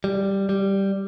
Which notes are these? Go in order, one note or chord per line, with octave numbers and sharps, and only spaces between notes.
G3
G3